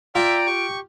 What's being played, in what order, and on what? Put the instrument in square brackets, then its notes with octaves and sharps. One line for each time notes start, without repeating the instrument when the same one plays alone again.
[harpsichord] F4 [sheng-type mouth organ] D5 G5 A#5 [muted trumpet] E5 [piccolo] D7
[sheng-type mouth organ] G4 [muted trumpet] C#6